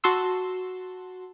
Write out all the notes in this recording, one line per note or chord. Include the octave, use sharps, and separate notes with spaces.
F#4 A5 C6 E6